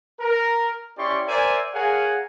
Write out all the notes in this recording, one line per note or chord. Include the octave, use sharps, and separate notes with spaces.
A#4
C#4 E4 G4 D5 C6 C#6
A#4 C5 D5 E5 G#5
G#4 A#4 C#5 F5 F#5 G#5